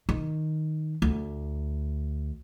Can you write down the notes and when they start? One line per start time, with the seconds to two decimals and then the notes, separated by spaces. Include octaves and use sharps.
0.09 D#3
1.02 D2